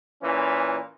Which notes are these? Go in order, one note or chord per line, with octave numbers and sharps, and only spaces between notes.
A#2 E3 C#4